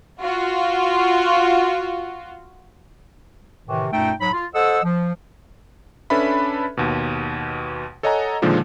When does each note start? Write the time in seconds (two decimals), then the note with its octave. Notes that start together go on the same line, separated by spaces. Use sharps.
0.21 F4 F#4
3.66 A2 C3 D#3 E3
3.92 F#2 A#2 A3 D#4 G5
4.20 G#2 F#3 B5
4.32 F4
4.55 A4 C5 D#5 F#5 E6
4.83 F3
6.10 C#4 D4 A4 B4 E5 B5
6.77 D#2 B2
8.03 A4 C#5 D#5 F#5 G#5 A#5
8.42 A#2 D3 D#3 F3 G#3 A#3